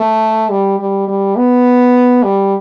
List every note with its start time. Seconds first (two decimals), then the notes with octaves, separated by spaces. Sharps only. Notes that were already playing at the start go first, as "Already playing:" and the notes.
Already playing: A3
0.50 G3
0.79 G3
1.08 G3
1.37 B3
2.23 G3